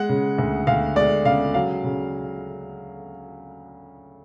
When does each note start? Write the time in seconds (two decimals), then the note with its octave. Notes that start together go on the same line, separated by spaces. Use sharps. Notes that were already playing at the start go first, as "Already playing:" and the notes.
Already playing: G#3 F#5
0.09 C#3
0.38 D2
0.67 D2 F5
0.96 G#3 D5
1.25 C#3 F5
1.54 F#3 F5
1.84 C#3